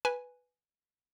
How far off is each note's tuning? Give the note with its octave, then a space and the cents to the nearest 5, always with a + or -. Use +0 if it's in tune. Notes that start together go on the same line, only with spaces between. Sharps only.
B4 +0 G#5 +0